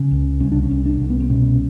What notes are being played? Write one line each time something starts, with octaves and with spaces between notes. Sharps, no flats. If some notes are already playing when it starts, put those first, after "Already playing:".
Already playing: C#3
C#2
C2 C#4
D4
C#4
C2
D4
C2
B3
C4
B2 C#4